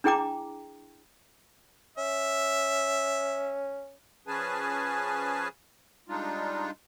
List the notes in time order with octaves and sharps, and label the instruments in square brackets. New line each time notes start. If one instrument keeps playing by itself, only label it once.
[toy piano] D4 E4 G#4 G5 A#5 D6
[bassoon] C#4 [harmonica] E5
[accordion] F3 C#4 G#4 B4 G#5 A5
G3 G#3 D4 D#4 F4